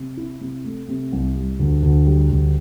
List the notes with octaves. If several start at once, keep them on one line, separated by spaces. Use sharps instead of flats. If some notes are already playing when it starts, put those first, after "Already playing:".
Already playing: C3
E4
C3
A3
C3
C2
G3
D2
D2
G3
D2